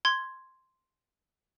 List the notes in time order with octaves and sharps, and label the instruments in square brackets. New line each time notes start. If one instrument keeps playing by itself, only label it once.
[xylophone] C6 G#6